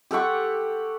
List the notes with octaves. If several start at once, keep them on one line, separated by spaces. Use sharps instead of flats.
G4 A4 F#5 C#6